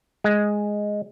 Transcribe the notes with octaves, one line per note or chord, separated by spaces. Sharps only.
G#3